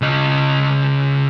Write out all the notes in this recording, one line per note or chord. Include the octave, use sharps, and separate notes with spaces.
C#3 D#5